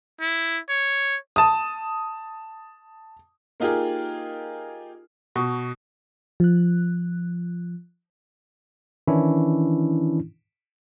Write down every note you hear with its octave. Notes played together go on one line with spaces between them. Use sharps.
E4
C#5
A5 D#6
A#3 D#4 F4 G4 G#4 A#4
B2
F3 F#6
D#3 E3 C#4 D4 E4